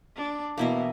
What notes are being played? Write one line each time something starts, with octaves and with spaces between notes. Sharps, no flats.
D4
B2 E3 A#3 E4 D#5